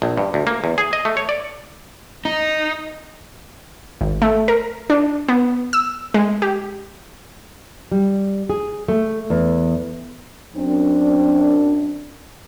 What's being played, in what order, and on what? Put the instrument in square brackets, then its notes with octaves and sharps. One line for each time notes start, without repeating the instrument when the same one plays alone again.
[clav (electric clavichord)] A#1
G2
D2
A#3
E2
G#4
D#5
A3
C#5
D5
[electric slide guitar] D#4
[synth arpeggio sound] G#1
A3
A#4
D4
B3
E6
G#3
G4
[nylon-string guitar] G3
G#4
A3
E2
[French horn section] F#2 C4 D4